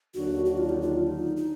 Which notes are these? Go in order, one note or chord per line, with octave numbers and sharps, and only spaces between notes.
D#2 D3 F#3 D4 F#4
F#4
F4
D#4
F4
D#4
D#4